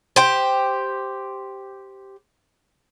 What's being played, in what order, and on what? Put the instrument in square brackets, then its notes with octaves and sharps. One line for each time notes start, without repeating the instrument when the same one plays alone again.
[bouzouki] G4 C5